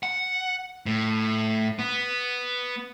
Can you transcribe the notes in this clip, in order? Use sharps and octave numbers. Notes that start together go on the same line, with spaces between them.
F#5
A2
B3